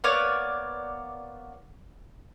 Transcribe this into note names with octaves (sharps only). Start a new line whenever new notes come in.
A#3 B3 C#5 D5